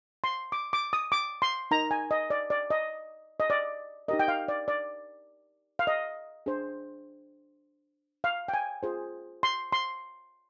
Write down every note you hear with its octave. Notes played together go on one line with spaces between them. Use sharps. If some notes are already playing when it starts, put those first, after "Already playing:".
C6
D6
D6
D#6
D6
C6
D#4 A#4 A#5
G#5
D#5
D5
D5
D#5
D#5
D5
D#4 G4 A#4 D#5
G5
F5
D5
D5
F5
D#5
D4 G#4 C5
F5
G5
G#5
F4 G#4 C5
C6
C6